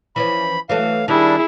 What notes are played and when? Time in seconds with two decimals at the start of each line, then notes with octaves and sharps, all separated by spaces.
0.16 E3 F3 C#4 B5
0.69 E3 F#3 A3 F5
1.08 D#3 G3 D4 E4 G#4